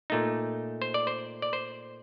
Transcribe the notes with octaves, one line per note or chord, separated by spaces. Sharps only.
A#2 A3 D#4
C5
D5
C5
D5
C5